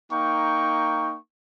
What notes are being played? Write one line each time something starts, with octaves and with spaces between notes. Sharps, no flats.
A#3 D#4 G5 C#6